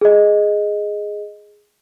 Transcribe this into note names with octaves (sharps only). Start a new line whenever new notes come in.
G#4 D#5